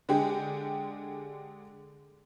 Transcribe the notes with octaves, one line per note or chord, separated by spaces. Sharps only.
D3 G#3 G4 G#4